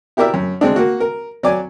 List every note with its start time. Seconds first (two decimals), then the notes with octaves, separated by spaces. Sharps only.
0.17 E4 G4 A#4 D5 E5
0.34 F#2
0.61 G#3 C4 D4
0.76 A#3 F#4
1.00 A#4
1.43 F#3 D5 G#5